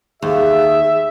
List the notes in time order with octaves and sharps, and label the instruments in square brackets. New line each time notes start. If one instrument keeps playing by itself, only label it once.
[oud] D#2 [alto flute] G#4 [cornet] E5